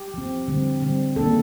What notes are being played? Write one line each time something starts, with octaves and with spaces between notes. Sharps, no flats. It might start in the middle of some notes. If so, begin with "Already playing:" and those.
Already playing: G4
F3 C4
D3 G3 C4
D3 G3 C4
D#3 A#3 D4 A4